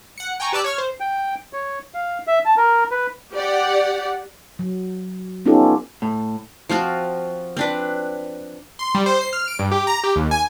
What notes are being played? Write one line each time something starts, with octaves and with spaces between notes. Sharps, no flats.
F#5 C#7
G5 G#5 A#5 C#6
G4 B4 D5 A5 D6 E6
C#5 C#6 F6
C5
G5
C#5
F5
E5
A5
A#4
B4
G4 D5 F#5
F#3
B3 C#4 D#4 F4 G4 A4
A2
F3 C4 F4 F#4
C4 D4 B4
C6
G3
C5
C7
F6
D7
G2
G4
A#5
G4
D#2
G#5